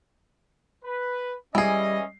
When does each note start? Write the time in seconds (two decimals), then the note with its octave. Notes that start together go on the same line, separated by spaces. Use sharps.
0.84 B4
1.55 E3 G3 C#4 G#4 D#5 C7